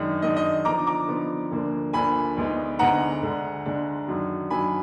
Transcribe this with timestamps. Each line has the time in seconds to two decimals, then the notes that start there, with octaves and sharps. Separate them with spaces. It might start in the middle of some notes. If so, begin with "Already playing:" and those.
Already playing: F#2 D#3 G#3 D4
0.22 F#2 D#3 G#3 D4 D#5
0.36 D#5
0.65 D3 F3 B3 D#4 A#5 D6
0.87 A#5 D6
1.08 D3 F3 B3 D#4
1.51 D2 D3 F3 A#3 D4
1.93 D2 D3 F3 A#3 D4 G#5 B5
2.37 D2 D3 G#3 B3 D#4
2.79 D2 D3 G#3 B3 D#4 F#5 A#5
3.22 D2 D3 G#3 D4
3.66 D2 D3 G#3 D4
4.08 F#2 D#3 F#3 D4
4.50 F#2 D#3 F#3 D4 G#5 B5